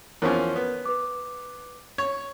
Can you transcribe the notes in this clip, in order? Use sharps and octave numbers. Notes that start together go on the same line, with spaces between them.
E2 F3 C#4 A#4 C#5
B3
B4 D6
C#5